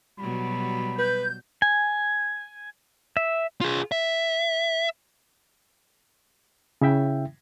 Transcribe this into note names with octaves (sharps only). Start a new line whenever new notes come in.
B2 F#3 G3 B5
B4 G6
G#5
E5
F4 G#4
E5
C#3 E4 E5 G5